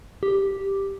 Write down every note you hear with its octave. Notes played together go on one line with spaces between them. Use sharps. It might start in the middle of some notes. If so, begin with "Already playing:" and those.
G4